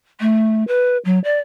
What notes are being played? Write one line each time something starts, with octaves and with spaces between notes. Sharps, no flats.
A3
B4
F#3
D5